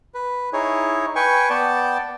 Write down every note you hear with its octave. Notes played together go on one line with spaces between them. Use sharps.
B4
D#4 E4 G#4 C#5
B4 G5 G#5 C#6
B3 D5 G5 A5